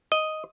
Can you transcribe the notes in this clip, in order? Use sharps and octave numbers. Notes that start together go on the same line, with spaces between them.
D#5